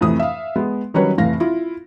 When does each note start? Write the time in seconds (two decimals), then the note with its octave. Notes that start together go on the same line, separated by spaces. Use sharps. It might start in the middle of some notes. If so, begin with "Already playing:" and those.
0.01 F2 A2 C3 E3 D#6
0.19 E5 F5
0.56 G#3 B3
0.94 D#3 F#3 G3 C#4 B4 C#5
1.18 F1 A2 E3 F5 A#6
1.40 E4 F4